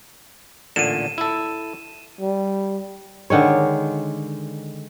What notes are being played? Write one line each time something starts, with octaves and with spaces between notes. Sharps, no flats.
A1 A#2 D3 D#7 E7
E4 A4
G3
D3 D#3 G#3 C#5